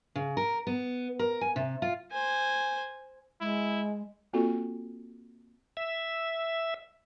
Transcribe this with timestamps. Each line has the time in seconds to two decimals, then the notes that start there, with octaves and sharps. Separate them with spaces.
0.16 C#3
0.37 A#4
0.67 B3
1.19 A#4
1.41 G#5
1.56 C3
1.82 F4
2.12 C5 G#5
3.41 G#3 E4
4.33 A#3 C4 F4 F#4 A4
5.77 E5